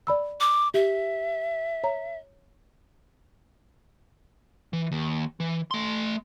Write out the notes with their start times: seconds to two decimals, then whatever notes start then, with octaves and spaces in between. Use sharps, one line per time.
0.07 D5 B5 E6
0.40 D6
0.74 G4 E5
1.84 C#5 A#5
4.73 E3
4.92 D#2
5.40 E3
5.71 A3 C6